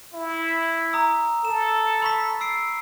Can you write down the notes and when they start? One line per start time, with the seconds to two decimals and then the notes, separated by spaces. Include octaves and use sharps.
0.14 E4
0.93 A#5 D#6 E6
1.45 A4 E7
2.02 B5 C#6 B6
2.41 E6 C7 D7